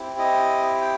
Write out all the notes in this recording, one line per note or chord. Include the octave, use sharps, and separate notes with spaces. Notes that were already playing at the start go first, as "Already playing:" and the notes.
Already playing: C4 E4 G4
D#5
G5